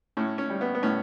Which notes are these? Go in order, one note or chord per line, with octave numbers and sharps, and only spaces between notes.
A2 C#4
C#4
G3
B3
B3
A2 C#4